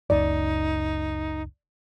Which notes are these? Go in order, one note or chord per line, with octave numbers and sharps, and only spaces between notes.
F#1 C#2 D#4 D5